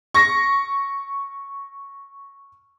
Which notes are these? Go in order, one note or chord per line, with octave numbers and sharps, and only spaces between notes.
C#6 A#6